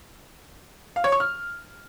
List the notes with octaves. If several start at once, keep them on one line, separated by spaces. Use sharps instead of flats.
F5
C#5
C#6
F6